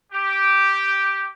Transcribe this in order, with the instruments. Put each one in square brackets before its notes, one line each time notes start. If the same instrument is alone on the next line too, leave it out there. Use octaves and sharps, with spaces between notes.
[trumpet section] G4